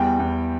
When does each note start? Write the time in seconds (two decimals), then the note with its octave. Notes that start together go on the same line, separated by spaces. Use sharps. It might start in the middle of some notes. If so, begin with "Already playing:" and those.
Already playing: E2 G3 G5
0.19 E2